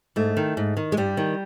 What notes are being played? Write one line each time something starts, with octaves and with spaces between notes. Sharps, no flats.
G#2 A3
D#3
G#2
D#3
G#3
G2 G3
D#3